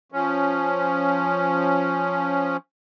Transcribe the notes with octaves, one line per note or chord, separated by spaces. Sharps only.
F3 C#4